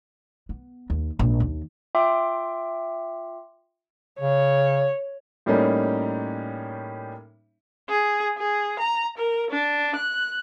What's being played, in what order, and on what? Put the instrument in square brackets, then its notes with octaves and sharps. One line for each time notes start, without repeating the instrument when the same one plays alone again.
[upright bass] B3
D#2
A#1 G#2
D#2
[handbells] F4 E5 G5 C6 D6
[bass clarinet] C#3 [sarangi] C#5
[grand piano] A2 G3 A#3 C#4 D#4
[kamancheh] G#4
G#4
A#5
A#4
D4
F#6